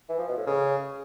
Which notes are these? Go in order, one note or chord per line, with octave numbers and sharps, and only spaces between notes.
E3
F3
B2
A2
C#3